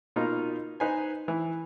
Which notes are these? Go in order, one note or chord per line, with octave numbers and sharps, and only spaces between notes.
B2 A#3 D#4 F4
D#4 B4 C5 G#5
E3